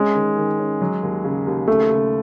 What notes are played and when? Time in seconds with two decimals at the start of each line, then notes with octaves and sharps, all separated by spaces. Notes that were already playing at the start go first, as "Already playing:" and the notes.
Already playing: G#3 C#4
0.15 D#3
0.37 D#3
0.59 C#4
0.81 F#3
1.03 D#2
1.24 C#3
1.46 D#2
1.67 C#3 A3
1.90 C#3